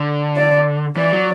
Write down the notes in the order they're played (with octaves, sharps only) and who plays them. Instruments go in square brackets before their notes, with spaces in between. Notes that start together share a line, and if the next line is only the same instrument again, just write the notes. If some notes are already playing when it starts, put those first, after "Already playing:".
Already playing: [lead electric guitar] D3
[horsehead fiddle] D5
[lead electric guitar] E3 [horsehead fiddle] D5
[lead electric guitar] F#3